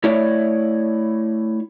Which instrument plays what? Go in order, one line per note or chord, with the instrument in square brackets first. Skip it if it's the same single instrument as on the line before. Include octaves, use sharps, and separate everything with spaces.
[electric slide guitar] A3 E4 C#5 D5